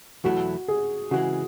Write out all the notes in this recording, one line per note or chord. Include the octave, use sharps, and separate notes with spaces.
E2 B2 F#3 A3 E4 F#4
G#4
C#3 E3 G#3 F#4